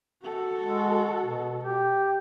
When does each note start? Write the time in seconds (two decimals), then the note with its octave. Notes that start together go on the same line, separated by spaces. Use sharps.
0.23 F#4 A4
0.60 G#3
1.25 B2
1.64 G4